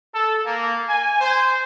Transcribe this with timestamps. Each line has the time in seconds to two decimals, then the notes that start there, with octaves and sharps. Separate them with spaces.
0.14 A4
0.46 A#3
0.88 G#5
1.20 C5